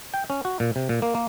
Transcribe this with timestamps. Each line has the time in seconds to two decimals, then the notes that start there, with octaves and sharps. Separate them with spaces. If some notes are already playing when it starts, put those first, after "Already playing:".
0.14 G5
0.30 C#4
0.45 F#4
0.60 A#2
0.76 C3
0.89 A#2
1.02 A#3
1.15 A#3